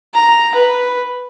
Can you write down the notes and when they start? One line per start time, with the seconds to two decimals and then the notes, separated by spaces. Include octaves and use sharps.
0.14 A#5
0.55 B4